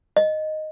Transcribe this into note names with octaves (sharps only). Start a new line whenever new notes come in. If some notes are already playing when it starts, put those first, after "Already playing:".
D#5